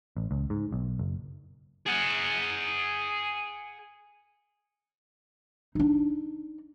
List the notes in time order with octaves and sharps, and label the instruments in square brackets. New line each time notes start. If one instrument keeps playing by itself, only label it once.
[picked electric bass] A1
C#2
G#2
B1
F#1
[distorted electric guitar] G#4 F#5
[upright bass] D4 D#4